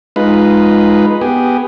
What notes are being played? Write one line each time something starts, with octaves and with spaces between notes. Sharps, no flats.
G#3 D#4 F4 B4
B3 G4 G#4